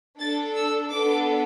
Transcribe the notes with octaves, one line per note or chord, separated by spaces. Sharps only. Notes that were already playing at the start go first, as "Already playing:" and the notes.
D4 A4 A6
E6
B3 D4 A4 D6